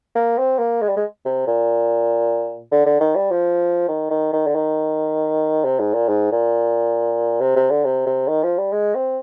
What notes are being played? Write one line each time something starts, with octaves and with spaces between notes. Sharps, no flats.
A#3
C4
A#3
G#3
G3
G#3
C3
A#2
D3
D3
D#3
G3
F3
D#3
D#3
D#3
D3
D#3
C3
G#2
A#2
G#2
A#2
C3
C3
D3
C3
C3
D#3
F3
G3
G#3
C4